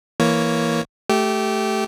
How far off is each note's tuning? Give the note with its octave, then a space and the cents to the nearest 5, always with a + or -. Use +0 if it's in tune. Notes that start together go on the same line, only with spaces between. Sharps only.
E3 +5 A#3 +0 C#5 +0
A3 -10 G4 -15